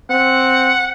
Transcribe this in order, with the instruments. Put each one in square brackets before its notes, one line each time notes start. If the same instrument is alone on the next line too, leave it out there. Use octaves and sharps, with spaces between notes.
[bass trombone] C4 [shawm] F#5